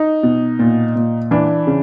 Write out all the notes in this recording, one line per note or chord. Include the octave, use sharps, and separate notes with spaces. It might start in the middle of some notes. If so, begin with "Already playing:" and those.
Already playing: D#4
B2
A#2
A#2
E3 D4
C#3